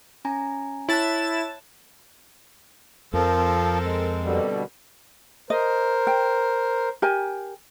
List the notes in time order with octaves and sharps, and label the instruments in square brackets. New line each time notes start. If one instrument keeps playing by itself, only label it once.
[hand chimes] C#4 G#5 A#5
[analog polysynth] E4 A6 E7 [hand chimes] C#5 A5 F#6
[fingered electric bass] F2 [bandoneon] F3 [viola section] C4 A4 A#4
[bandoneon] G#3
[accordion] B2 D3 G3
[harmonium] A#4 C5 [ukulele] D#5
[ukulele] G5
G4 A#4 G#5